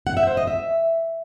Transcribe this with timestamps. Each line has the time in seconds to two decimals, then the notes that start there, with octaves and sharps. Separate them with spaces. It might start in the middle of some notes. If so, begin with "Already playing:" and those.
0.07 F#5
0.17 E5
0.27 C5
0.37 D#5
0.47 E5